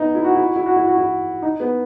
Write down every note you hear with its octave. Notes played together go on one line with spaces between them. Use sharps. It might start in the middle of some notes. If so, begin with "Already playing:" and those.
Already playing: B3 D#4
E4
F#4
E4
F#4
E4
F#4
E4
F#4
E4
D#4
B3